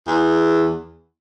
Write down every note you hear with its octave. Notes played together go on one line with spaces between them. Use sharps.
E2